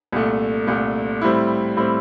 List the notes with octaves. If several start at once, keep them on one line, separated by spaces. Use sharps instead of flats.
C2 A#2 A3
C2 A#2 A3
A2 G3 C4 E4
A2 G3 C4 E4